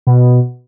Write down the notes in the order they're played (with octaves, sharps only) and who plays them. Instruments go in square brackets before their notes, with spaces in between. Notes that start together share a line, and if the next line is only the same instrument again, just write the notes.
[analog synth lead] B2